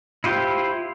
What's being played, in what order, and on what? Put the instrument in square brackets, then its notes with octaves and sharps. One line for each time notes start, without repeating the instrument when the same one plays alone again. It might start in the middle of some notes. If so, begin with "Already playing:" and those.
[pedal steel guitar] E4 F4 G4 C5